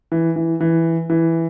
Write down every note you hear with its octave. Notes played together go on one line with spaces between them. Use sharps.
E3
E3
E3
E3